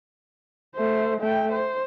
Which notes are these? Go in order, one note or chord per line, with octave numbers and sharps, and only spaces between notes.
A3 C5
A3 G5
C5